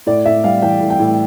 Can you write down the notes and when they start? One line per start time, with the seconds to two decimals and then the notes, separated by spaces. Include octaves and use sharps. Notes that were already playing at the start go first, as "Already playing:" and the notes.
0.06 A2 D5
0.26 A2 E5
0.44 G3 F5
0.62 E3 G5
0.81 A2
0.90 G5
0.99 A2